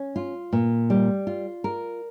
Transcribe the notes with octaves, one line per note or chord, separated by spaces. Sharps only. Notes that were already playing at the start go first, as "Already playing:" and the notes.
Already playing: C#4
F4
A#2
G3
F4
A#4